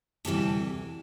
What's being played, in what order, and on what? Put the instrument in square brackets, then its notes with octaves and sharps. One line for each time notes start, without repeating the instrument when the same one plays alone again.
[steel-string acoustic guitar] D2 C3 E3 G3 A4